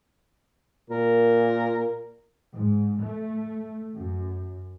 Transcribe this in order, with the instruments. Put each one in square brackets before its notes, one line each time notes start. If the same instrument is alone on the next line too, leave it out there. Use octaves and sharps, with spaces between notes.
[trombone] A#2 [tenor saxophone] A#4
[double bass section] G#2
A3
F#2